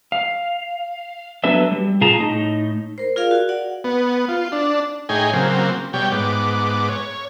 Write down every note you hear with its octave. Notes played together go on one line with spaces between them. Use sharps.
F5
F#3 B3 D4 A4 B4 E5
G3
A#2 F4 G#4 A5 A#5
A2 D#4
A#4 C5
F4 G#4 A#4 D5 F5
F#4
D5 F#5
B3
F4
D4
A2 D#4 G#4 C#5 G5 G#5
C#3 F#3 A#3 C4
B2 G3 C#5 G5
G#2 B3 D6
C#5